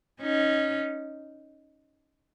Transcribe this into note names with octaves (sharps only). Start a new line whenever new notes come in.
C#4 D#4